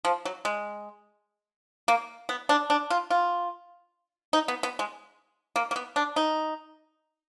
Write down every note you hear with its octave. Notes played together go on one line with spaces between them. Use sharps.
F3
F#3
G#3
A#3
B3
D4
D4
F4
F4
D#4
B3
B3
G#3
A#3
A#3
B3
D4
D#4